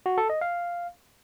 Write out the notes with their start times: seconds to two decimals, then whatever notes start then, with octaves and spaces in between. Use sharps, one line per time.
0.06 F#4
0.18 A4
0.30 D#5
0.41 F5